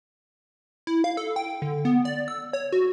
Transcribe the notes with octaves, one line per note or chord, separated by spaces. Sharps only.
E4
F5
A4
G5
D3
B3
D5
E6
C#5
F#4